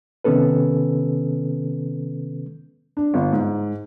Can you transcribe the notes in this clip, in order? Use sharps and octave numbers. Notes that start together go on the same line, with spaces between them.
C3 D#3 B3 C#4 A4 B4
D4
G1
G#2